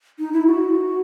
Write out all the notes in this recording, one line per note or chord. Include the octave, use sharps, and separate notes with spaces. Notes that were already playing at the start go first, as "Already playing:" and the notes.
D#4
E4
F#4